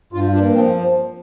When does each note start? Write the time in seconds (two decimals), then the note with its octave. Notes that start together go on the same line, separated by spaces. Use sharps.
0.13 G2 F4
0.33 A#2 D4
0.54 F3 C4